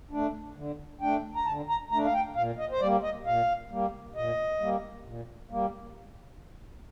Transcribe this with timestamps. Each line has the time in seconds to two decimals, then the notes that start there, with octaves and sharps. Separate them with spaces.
0.11 A3 D4
0.56 D3
1.01 A3 D4 G5
1.35 A#5
1.46 D3 A5
1.69 A#5
1.91 A3 A#5
1.95 D4
2.05 F5
2.14 G5
2.36 A#2 F5
2.58 D#5
2.71 C5
2.81 G3 A#3 D5
3.03 D#5
3.26 A#2 F5
3.71 G3 A#3
4.15 A#2 D#5
4.60 G3 A#3
5.05 A#2
5.50 G3 A#3